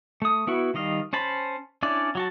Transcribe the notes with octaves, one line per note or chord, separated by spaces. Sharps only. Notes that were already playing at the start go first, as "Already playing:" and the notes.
A3 D#6
B3 E4 F#4
D#3 G3 D#5 F5
C#4 C5 A5 B5
C#4 D4 E4 D5
F#3 F#4 A5